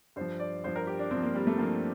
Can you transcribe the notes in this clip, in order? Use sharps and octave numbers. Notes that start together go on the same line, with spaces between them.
G2 F3 C5
D5
G2 F3 C5
A#4
G4
D4
G2 C4
F3
A#3
G3
A3
G2 F3 A#3